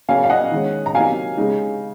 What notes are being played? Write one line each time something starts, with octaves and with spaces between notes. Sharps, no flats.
C#3 F#3 A#3 C#4 F5 G#5
F5
D#5 F#5
D#3 G#3 C#4
A#5
C3 F#3 A#3 D#4 F5 G#5
C#3 G#3 D#4